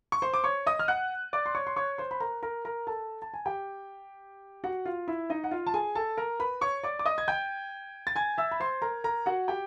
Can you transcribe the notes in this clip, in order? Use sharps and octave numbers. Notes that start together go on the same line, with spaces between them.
C#6
C5 C6
D6
C#5 C#6
D#5 D#6
F6
F#5 F#6
D5 D6
C6
C#5 C#6
C6
C#5 C#6
C5 C6
B5
A#4 A#5
A#4 A#5
A#4 A#5
A4 A5
A5
G#5
G4 G5
F#4 F#5
F4 F5
E4 E5
D#4 D#5
F#5
F4 F5
A5
G#4 G#5
A4 A5
A#4 A#5
B4 B5
C#5 C#6
D5 D6
D6
D#5 D#6
G#6
G5 G6
A6
G#5 G#6
E5 E6
B5
C5 C6
A#4 A#5
A#4 A#5
F#4 F#5
G4 G5